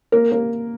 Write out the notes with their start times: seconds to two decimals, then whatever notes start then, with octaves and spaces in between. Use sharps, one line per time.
0.12 A#3 A#4
0.32 A#3 A#4